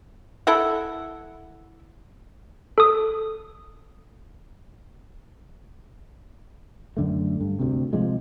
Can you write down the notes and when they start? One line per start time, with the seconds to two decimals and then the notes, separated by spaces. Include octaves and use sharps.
0.47 E4 A4 E5 F#5
2.78 A4 D#6
6.97 F#2 D3 A3
7.41 G2
7.60 D2 C3
7.93 C3 F3 G#3